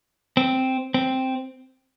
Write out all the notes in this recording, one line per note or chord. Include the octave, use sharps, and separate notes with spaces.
C4
C4